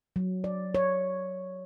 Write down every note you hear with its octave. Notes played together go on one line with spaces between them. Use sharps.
F#3
D5
C#5